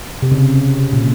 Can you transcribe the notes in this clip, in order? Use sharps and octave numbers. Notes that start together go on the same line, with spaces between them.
C3
C#3
A#2